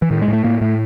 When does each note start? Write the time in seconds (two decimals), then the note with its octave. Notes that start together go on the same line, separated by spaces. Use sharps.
0.02 E3
0.11 A2 D#3
0.22 G#3
0.28 A2 A3
0.44 A2 A#3
0.61 A2 A3